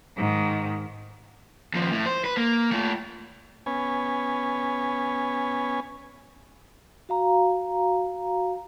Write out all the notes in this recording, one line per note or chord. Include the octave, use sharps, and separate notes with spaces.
G#2 D#3
D#2 F3
A2
C5
B4
A#3
A3 F4
B3 C#4 G#5
F#4 F5 A#5